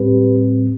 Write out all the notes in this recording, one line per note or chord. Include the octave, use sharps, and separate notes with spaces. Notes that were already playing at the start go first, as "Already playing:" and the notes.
Already playing: A2 G3 C4 G4 B4